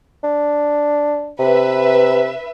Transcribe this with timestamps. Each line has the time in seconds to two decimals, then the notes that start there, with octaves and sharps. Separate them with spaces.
0.24 D4
1.39 C3 B4 E5